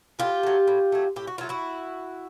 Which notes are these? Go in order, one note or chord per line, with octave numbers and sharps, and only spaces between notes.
A2 F4 G4
F#3 A3
A2
F#3 A3
A2 G4
F#4
F#3 A3 F4
E4 F#4